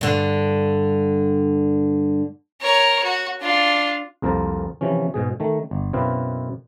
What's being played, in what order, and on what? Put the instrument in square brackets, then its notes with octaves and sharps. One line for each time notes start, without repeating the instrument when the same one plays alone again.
[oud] G2 D3
[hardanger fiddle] A#4 C#5
F#4
D4 F4
[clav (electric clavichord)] C2 F2 A#3 A#4 C5 A5
C3 E3 F3 C#4
G#2 B2 G#4
D#3 A3
G1
F#2 B2 C4 E4 B4 F5